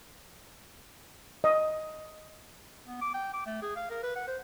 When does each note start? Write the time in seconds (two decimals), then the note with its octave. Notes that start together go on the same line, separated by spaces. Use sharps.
1.44 D#5
2.87 B3
3.02 D6
3.14 G5
3.33 D6
3.46 A3
3.63 G#4
3.76 F5
3.90 A#4
4.03 B4
4.16 F#5
4.28 C5